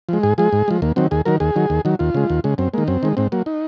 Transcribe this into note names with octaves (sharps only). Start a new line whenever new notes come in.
F3 G#3
G#2 G#4
F3 G#3 G#4
G#2
F3 G#3
D#2 A#3
D#3 F#3 C4
D#2 G#4
D#3 F#3 A#4
D#2 G#4
D#3 F#3
D#2
D#3 F#3
D#2 F4
C#3 G#3
D#2
C#3 G#3
F#2 C4
D#3 G#3 A#3
F#2 C4
D#3 G#3
G#2 C4
F#3 A#3
D#4